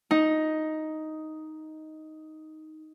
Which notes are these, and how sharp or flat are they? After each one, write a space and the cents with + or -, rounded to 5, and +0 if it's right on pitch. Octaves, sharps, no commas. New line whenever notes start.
D#4 +5